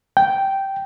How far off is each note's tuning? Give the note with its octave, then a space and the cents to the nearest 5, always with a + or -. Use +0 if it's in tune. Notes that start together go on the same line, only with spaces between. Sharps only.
G5 -5